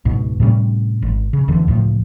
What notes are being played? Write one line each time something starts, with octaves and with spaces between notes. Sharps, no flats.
C#2 G#2 B2
A2 C3 G3 C#4
G#1
C#3
E1 E2 D3 E3
C#2 A2 F3